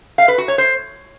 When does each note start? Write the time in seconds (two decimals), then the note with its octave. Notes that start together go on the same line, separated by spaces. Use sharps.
0.18 F5
0.28 B4
0.38 F#4
0.48 C#5
0.58 C5